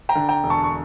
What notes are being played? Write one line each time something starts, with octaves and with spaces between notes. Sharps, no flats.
G5 A#5
D3
G5 A#5
E1
A5 C#6
C#6